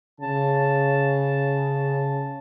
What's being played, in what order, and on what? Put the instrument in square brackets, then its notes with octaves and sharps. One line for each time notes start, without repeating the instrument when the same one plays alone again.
[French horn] C#3 [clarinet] A5